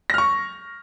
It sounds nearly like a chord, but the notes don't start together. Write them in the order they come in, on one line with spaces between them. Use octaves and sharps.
A#6 F6 C#6